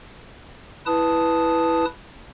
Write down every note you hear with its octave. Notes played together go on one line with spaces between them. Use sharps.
E4 B4 A5 D#6